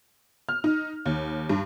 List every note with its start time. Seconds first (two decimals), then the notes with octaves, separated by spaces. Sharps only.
0.49 F6
0.64 D#4
1.06 D#2
1.50 G2